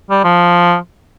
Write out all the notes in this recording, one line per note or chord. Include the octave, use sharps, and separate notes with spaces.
G3
F3